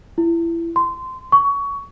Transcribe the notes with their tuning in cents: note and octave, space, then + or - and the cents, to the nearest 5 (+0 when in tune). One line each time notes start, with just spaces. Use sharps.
E4 +25
C6 -15
C#6 +20